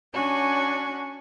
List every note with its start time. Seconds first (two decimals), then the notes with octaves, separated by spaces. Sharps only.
0.13 C#4 D4 F#4 G#5